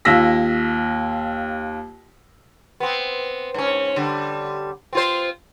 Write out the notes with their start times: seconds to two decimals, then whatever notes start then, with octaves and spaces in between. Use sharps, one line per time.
0.05 D#2 F4 E6 A#6 B6
2.80 B3 C4
3.54 G#2 C#4
3.96 D3 G3
4.93 C4 F4 C5